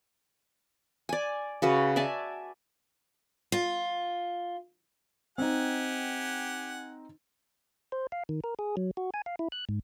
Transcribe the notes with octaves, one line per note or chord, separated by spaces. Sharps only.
D5 G#5
C#3 F#4 B4
D5 E5 G#5 A5
F4
C4 D#4 G4 F#5 G#5
C5
F5
D#3
A#4
G#4
F#3
F#4
G#5
F5
E4
F#6
G#2